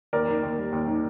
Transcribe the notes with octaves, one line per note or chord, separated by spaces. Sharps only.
D#2 A#4 D5
D#3
D#2
G3
D#2
D#3